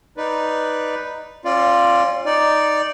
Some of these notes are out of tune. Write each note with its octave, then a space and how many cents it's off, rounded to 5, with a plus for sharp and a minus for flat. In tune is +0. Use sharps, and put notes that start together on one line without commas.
D#4 +0 B4 +0 D5 +0
C#4 -35 F4 +0 D5 +0
D#4 +0 D5 +0